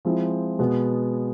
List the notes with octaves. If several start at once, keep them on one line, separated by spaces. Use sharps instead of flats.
F3 G#3 C4 E4
B2 G#3 B3